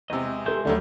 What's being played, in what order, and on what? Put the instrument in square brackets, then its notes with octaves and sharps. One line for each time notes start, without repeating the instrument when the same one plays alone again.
[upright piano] E2 C3 [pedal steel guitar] G#3 D#5
[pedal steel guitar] G#3 E5 G6 [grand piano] G4 A4 C6
[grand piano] D2 [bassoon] D3 [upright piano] F#3 G3 A3